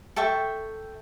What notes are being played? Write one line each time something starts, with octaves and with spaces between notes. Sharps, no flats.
A4 E5 G5 C#6